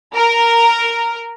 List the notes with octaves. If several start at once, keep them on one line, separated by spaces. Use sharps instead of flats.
A#4